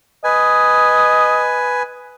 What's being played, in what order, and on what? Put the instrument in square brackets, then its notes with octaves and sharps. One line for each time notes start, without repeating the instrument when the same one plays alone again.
[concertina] B4 G#5 [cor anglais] D#5